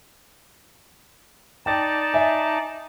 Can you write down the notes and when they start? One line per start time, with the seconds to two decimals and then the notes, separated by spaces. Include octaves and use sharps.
1.66 D#4 D5 G5 A5 A6
2.13 D#5 E5 G#5